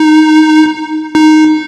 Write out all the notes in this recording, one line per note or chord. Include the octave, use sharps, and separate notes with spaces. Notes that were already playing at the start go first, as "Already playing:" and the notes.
Already playing: D#4
D#4